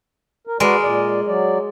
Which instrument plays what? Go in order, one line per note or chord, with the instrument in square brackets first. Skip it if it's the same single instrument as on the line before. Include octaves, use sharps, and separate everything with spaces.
[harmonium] A#4
[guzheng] G#3 A#4 [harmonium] F#4 B4 D5
[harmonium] A#2 D5
F#3 D5